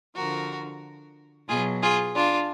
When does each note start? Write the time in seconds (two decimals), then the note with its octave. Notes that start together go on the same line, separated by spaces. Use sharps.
0.15 D3 F3 F#4 A#4
1.48 B2 F#3 F4 G#4
1.82 F4 G#4
2.15 D4 F4